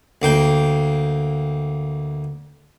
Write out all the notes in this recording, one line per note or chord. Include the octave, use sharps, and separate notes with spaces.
D2 A#3 G5